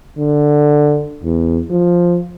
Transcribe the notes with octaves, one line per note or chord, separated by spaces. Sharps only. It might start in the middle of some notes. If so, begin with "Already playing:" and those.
D3
E2
F3